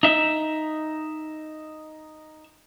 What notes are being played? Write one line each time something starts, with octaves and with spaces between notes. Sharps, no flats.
D#4 E5